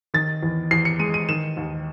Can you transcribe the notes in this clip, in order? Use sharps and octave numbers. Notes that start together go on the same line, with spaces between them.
D#3 A6
E2
E2 C7
C#7
G#3 D#7
D#7
D#3 E7
D#2